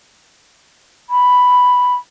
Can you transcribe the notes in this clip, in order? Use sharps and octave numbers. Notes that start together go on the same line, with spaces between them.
B5